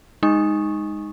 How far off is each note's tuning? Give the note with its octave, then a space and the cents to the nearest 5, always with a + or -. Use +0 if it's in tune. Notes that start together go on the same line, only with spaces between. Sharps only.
G#3 -10 D#4 +0 C#6 -10